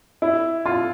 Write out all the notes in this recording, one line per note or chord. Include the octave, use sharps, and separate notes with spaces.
E4
F4